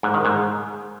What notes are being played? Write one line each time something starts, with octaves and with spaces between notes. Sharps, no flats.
G#2
D#3
G#2